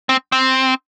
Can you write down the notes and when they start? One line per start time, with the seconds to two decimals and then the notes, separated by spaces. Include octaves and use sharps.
0.09 C4
0.32 C4